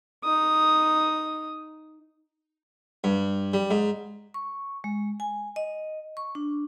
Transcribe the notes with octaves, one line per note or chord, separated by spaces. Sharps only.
D#4 D#6
G2
G3
G#2
C#6
G#3
G#5
D#5
C#6
D4